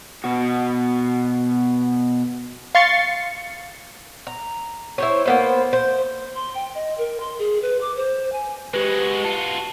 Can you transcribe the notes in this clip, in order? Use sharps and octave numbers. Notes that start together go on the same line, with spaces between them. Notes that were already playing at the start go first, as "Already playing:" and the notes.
B2 F#4
F5 C6 C#6 A6 C7 C#7
A#5
E4 C5 C#5
A#3 B3 C5
C5
C6
G5
D#5
A#4
C6
G#4
B4
D6
C5
G#5
G#3 F#4 G4 B4
F4 F#4 A5